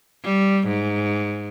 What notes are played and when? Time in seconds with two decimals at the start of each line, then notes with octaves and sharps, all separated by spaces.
0.23 G3
0.67 G#2